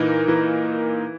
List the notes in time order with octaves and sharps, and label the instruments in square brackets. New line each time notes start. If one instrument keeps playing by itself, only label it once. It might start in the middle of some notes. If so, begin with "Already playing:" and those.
Already playing: [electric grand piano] A#2 A#3 D#4 A#4 [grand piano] E3
[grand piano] E3